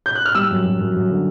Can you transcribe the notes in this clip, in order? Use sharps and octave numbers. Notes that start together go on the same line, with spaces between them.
G6
F#6
F6
G3 E6
F#2
F#2
F#2
F#2
D3